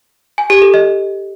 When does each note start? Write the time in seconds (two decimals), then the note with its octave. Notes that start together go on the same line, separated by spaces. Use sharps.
0.38 G#5
0.50 G4
0.62 A4
0.74 D#5